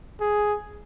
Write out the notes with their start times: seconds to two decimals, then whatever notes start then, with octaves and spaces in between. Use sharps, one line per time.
0.21 G#4